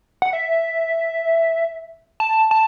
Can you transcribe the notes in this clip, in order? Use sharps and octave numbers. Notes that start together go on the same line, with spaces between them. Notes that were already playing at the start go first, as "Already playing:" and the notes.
F#5
E5
A5
A5